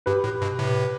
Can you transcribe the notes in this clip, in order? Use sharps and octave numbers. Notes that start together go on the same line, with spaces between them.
G2 G4 B4
A2
G2 B2
A2 C3